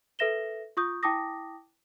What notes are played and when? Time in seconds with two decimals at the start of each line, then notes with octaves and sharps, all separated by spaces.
0.19 A4 B4 E5 A#6 E7 G7
0.77 F4 C#6 D#6 G6
1.03 E4 G5 A5 D6 D#6 A#6